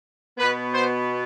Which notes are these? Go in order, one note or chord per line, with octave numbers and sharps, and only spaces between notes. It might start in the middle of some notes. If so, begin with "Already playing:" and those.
B2 B3 B4
C5